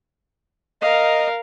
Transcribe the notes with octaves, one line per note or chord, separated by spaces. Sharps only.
A#4 D#5 F5